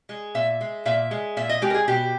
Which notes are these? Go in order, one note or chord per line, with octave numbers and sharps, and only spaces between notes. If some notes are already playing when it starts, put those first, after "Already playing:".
G#3
A#2 E5
G#3
A#2 E5
G#3
A#2 E5
D#5
G#3 G4
A#4
G#4
B2 G4